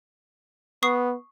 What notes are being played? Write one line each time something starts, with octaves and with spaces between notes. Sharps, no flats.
B3 C#6 D#6 C7